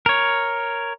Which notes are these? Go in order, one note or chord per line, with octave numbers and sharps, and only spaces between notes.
A#4 C#5